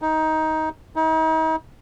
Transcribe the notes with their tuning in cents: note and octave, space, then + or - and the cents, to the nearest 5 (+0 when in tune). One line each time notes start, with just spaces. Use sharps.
D#4 +15
D#4 +40